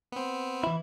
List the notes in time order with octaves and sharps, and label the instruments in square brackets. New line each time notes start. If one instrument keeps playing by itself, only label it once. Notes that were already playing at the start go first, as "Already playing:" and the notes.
[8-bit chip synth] B3 C4
[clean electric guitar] E3 E4